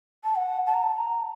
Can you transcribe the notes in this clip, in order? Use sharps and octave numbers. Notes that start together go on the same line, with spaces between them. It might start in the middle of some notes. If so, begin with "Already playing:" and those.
A5
F#5
A5
A#5
A5
A#5